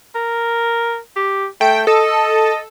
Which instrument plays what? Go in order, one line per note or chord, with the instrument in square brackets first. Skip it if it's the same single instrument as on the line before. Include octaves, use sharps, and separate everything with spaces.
[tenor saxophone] A#4
G4
[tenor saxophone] A3 [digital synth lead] G5
[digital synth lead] A4 [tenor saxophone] D#5